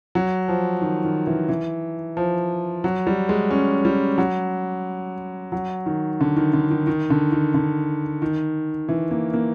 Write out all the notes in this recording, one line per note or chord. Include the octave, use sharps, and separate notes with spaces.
F#3
F3
D#3
D#3
E3
E3
F3
F#3
G3
G#3
C#4
G3
F#3
F#3
D#3
D3
D#3
D3
D#3
D#3
D3
D#3
D3
D#3
E3
A#3
A#3